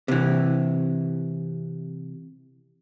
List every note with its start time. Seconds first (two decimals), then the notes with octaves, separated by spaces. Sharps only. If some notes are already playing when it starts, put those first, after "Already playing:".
0.08 C3 E3